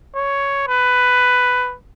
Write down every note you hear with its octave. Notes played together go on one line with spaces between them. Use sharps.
C#5
B4